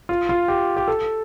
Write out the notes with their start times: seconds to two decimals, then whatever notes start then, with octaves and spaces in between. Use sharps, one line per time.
0.09 F4
0.29 F4
0.48 G4
0.77 G4
0.88 A4